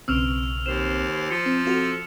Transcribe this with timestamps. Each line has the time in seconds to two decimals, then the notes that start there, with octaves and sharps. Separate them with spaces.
0.08 B1 C#3 C4 E6 F6 F7
0.66 D#2 C5 E7
1.31 F3 C#7
1.46 C4
1.65 C4 F4 F#4 A4